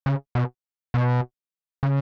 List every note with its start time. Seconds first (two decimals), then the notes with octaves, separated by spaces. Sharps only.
0.06 C#3
0.35 B2
0.94 B2
1.83 C#3